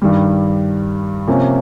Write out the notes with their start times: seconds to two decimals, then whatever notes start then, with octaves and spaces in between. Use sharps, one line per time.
0.02 G2 D#3 G3
1.28 C3 F3 A#3 C#4